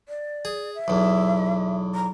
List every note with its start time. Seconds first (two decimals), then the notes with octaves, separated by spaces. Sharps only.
0.09 D5
0.45 G#4
0.75 E5
0.88 B1 E2
1.95 A#5